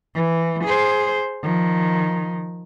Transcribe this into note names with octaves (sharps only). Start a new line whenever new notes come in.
E3
G#4 C5
D#3 F3